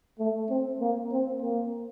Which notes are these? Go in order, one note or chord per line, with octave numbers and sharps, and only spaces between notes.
A3
C4
A#3
C4
A#3